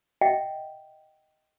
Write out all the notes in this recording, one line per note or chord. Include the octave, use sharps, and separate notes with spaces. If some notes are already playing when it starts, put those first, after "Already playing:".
D#5 E5 F#5 G5